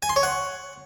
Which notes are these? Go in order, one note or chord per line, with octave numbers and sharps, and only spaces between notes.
G#5
C6
C#5
F#5